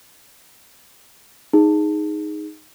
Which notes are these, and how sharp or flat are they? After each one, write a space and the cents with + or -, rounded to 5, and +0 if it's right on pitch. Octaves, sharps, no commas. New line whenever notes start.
D#4 +0 G#4 +0